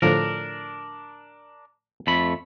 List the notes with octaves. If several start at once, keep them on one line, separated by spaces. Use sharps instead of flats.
A2 D3 F3 D4 A#4
F2 A3 B5